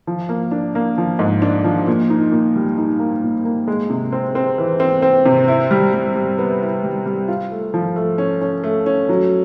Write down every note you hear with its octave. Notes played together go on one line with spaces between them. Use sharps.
F3
A#3
D4
A#3
F3
G#2
D4
F3
A#2
D#4
A#2
G3
D#4
A#3
A#2
A#3
G#3
C3
C4
C4
E3
C4
C4
C3
E4
G3
G3
G3
B3
E4
G3
G3
F4
A3
F3
A3
C#4
C#4
A3
C#4
F#3